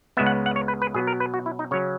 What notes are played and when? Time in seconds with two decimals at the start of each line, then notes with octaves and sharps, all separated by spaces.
0.17 C#2 C#3 G#3 B3 E5
0.27 F#5
0.46 F#5
0.56 C#5
0.68 B4
0.82 B4
0.94 B2 F#3 B3 G#4
1.07 A#4
1.20 B4
1.34 F#4
1.46 E4
1.59 D#4
1.71 C#3 F#3 C#4 C#5